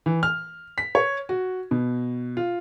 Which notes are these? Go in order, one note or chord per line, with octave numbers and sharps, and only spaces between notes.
E3
F6
B6
C#5
F#4
B2
F4